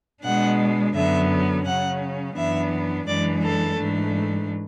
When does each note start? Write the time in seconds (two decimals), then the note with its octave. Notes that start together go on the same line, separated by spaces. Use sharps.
0.24 B2 G#3 D4 F#5
0.94 F#2 D3 F#3 B3 E5
1.65 C#3 F#3 C#4 F#5
2.36 F#2 E3 B3 D4 E5
3.07 F#2 E3 G#3 D4 D5
3.43 A4
3.78 G#2 E3 A3 D4